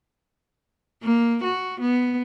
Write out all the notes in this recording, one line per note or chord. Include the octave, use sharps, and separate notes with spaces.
A#3
F#4
B3